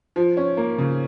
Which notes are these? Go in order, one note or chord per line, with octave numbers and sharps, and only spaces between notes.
F3
C#4
A#3
C#3